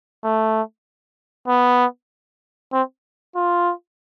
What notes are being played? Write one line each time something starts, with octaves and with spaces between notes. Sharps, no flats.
A3
B3
C4
F4